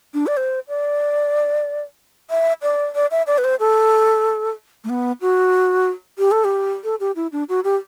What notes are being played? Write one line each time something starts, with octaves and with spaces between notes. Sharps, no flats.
D4
D5
C5
D5
E5
D5
D5
E5
D5
B4
C5
A4
A3
B3
F#4
G4
A4
G4
A4
G4
E4
D4
F#4
G4